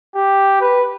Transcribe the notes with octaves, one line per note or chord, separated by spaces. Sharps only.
G4
B4